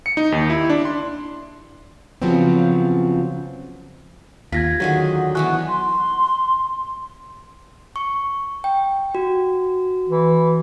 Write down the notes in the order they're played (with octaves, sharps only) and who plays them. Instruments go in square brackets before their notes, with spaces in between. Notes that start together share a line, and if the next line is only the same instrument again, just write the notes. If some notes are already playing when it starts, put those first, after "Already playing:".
[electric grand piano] C#7
D#4
D#2
E4
D4
C6
[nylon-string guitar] C#3 F3 F#3 B3 C4
[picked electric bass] D#2 [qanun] F4 [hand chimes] G#6 A#6 B6
[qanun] D3 D#3 G#4 [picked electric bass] F#3 [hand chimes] F#4 C#5 F#5
[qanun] B2 E3 B3 [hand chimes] G#5 C#6 F#6
[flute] C6
[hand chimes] C#6
G5
F#4
[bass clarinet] E3